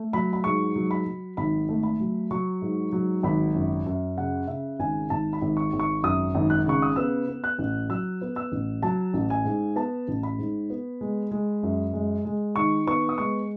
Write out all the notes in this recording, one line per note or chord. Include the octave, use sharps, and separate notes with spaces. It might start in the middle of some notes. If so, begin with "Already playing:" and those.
Already playing: A3
F#3 B5
B5
G#2 C#6
F#3
B5
F#3
G#1 B5
A3
B5
F#3
F#3 C#6
G#2
F#3
G#1 B5
F#2
F#2
C#3 F#5
C#3 E5
G#1 G#5
G#1 A5
B5
G#1
C#6
G#1
C#6
F#2 D#6
G#1
F#6
C#3 C#6
D#6
B3 E6
B3
F#6
A1
F#3 E6
B3
E6
A1
F#3 A5
A1
G#5
G#2
B3 A5
A1
B5
G#2
B3
G#3
G#3
F#2
G#3
G#3
D#3 C#6
B3 C#6
D#6
G#3 C#6